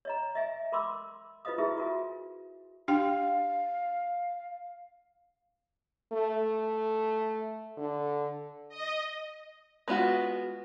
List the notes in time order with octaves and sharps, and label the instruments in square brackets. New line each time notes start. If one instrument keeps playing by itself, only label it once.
[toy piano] C#5 D#5 A#5
D#5 E5 G#5
A#4 B5 C6 D6 E6
F4 B4 C5 D#5 F5 D#6
E4 F#4 G#4 A#4 B4 E5
F4 F#4 A#4 G#5
[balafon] D4 G4 G5 [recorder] F5
[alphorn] A3
D3
[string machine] D#5
[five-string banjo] G#3 B3 D4 F4 F#4